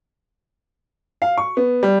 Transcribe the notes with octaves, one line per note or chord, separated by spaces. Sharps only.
F5
C#6
B3
G3